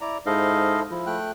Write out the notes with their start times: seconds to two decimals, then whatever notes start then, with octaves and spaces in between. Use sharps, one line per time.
0.01 E4 D5 A#5
0.26 G#2 E4 A4 C5 D#5 F5
0.91 F3 E4
1.07 A3 G5 F#6